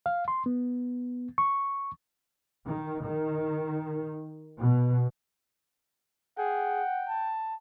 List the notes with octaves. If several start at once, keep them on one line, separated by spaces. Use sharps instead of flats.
F5
C6
B3
C#6
D#3
D#3
B2
G#4 F#5 G5
A5